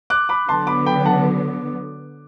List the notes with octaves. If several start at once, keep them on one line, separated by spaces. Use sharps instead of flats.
D6 F#6
B5 D6
D3 F#3 B3 A5 C6
B5 D6
G5 B5
F#5 A5